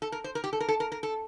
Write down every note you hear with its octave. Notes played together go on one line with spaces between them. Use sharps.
A4
A#4
C5
A#4
G4
A4
A#4
A4
A#4
A#4
A4